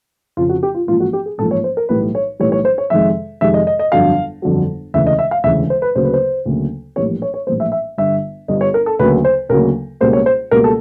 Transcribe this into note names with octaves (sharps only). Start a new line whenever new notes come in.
F1 F2 C#3 F3 F4
F#4
G4
F4
A1 G#2 F3 A#3 F4
F#4
G4
G#4
A1 G#2 F3 A#3 A4
C#5
C5
A#4
B1 A2 E3 G3 B4
C#5
B1 A2 E3 G3 C#5
C#5
C5
C#5
F2 C3 D#3 G#3 E5
F2 C3 D#3 G#3 E5
D#5
D#5
D#5
G1 F2 D3 F#3 F5
G1 F2 D3 F#3
E1 D2 C#3 E3 E5
D#5
E5
F5
E1 D2 C#3 E3 E5
C5
B4
D2 C#3 F#3 A#3 C5
B4
C5
D2 C#3 F#3 A#3
A#1 A2 E3 G3 A#3 C#5
C#5
C#5
A#1 A2 E3 G3 A#3 C5
E5
E5
G1 G2 D3 E5
G1 G2 D3 D#5
C#5
A#4
A4
D2 C#3 F#3 A#3 B4
C5
D2 C#3 F#3 A#3 A#4
C#2 B2 G3 A#3 C5
C#5
C5
C#2 B2 G3 A#3 A#4
A4